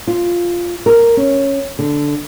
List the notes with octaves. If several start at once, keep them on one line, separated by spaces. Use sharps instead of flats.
F4
A#4
C#4
D3